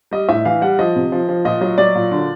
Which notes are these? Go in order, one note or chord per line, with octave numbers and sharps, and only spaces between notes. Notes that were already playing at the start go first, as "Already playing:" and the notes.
G3 D#5
A2 E5
E3 F5
G3 F#5
F3 D#5
C3
F3
F3
A#2 D#5
F#3 D#5
F#3 D5
A#2
D3